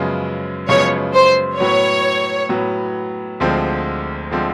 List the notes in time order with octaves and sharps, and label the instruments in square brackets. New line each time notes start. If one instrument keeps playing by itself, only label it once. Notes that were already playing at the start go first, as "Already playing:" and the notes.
Already playing: [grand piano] F#2 C#3 F3 G#3 B3
[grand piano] F#2 C#3 F3 G#3 B3 [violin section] C#5
[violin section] C5
[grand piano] A2 F#3 B3 [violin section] C#5
[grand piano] A2 F#3 B3
D2 D3 F3 G#3 C4
D3 F3 G#3 C4